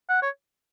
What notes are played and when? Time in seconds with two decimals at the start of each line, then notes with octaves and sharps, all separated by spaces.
0.09 F#5
0.22 C#5